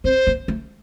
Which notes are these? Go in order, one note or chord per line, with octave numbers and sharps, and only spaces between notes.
C4 C5
A#3
A3